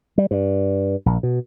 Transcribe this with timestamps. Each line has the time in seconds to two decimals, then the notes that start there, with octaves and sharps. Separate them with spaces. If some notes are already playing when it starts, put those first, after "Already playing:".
0.18 G3
0.31 G2
1.06 A#1
1.23 B2